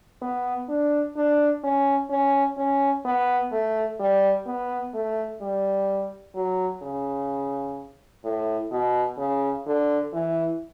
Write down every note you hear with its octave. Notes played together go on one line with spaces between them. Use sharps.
B3
D4
D4
C#4
C#4
C#4
B3
A3
G3
B3
A3
G3
F#3
C#3
A2
B2
C#3
D3
E3